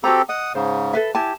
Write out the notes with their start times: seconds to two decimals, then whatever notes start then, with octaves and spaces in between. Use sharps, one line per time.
0.04 C4 F#4 G4 A4 B4 A#5
0.29 D#5 F#5 D#6
0.55 G#2 C#3 C5
0.93 A4 B4 E5
1.15 E4 G4 G#5 A5